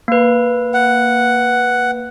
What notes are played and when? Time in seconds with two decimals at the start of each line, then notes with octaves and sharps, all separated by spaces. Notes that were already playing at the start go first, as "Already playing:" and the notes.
0.08 A#3 B4
0.74 F#5